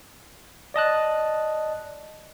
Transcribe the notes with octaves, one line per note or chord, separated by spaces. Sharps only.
D5 D#5 A5 F#6